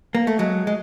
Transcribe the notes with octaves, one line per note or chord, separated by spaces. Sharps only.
A#3
A3
F#3 G#3
G#3